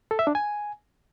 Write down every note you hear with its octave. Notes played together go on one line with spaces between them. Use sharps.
A4
E5
D4
G#5